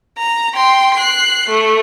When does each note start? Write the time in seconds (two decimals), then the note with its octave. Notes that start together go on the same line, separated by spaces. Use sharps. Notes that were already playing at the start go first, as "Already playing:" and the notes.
0.18 A#5
0.55 G5 C6
0.94 F#6 C7
1.48 A3